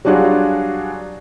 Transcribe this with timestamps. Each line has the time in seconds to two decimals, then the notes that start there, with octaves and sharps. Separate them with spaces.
0.05 F#3 G3 D4 F4 F#4 G#4